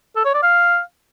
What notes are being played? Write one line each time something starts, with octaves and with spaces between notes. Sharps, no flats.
A4
C#5
D5
F5